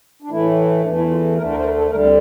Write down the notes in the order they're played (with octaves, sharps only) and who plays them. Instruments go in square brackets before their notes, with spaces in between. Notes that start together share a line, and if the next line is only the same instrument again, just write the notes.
[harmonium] D4
A2 E3 A3 E4
E2 E3 A3 D4
E4
F4
D2 D3 A3 A#4
A#4
C5
A#4
A4
D2 D3 G3 A#4
C4